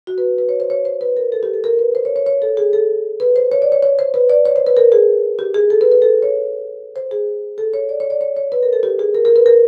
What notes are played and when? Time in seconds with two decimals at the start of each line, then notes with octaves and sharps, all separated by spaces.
0.07 F#4
0.18 B4
0.38 B4
0.49 C#5
0.60 C5
0.70 C#5
0.85 C5
1.01 B4
1.17 A#4
1.32 A4
1.43 G4
1.53 A4
1.64 A#4
1.79 B4
1.95 C5
2.05 C#5
2.16 C#5
2.26 C#5
2.42 A4
2.57 G#4
2.73 A4
3.20 B4
3.36 C5
3.52 C#5
3.62 D5
3.72 C#5
3.83 C#5
3.99 C5
4.14 B4
4.30 D5
4.45 C#5
4.56 C5
4.66 B4
4.77 A#4
4.92 G#4
5.39 G4
5.54 G#4
5.70 A4
5.81 B4
5.92 B4
6.02 A4
6.23 C#5
6.96 C5
7.11 G#4
7.58 A4
7.74 C#5
7.89 D5
8.00 C#5
8.10 D5
8.21 C#5
8.36 C#5
8.52 B4
8.63 A#4
8.73 A4
8.83 G4
8.99 G#4
9.15 A#4
9.25 A#4
9.36 B4
9.46 A#4